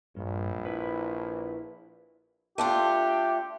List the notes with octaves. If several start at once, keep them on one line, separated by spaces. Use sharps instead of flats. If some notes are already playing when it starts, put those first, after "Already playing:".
A#1 G2
E4 B4
A3 D4 F4 G4